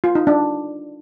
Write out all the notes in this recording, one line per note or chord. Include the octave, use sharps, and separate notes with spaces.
F4
D#4
D4